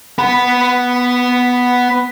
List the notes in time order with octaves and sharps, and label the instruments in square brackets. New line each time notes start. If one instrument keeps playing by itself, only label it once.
[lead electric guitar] B3 B5